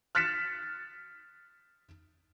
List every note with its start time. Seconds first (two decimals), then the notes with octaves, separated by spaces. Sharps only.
0.15 F6 F#6 A6 B6 C#7 E7